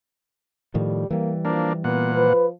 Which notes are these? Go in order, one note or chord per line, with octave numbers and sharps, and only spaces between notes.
A2 D#3 F3 G3
E3 G3 A#3
F3 A#3 D4
A#2 B3 F#5
F3 B4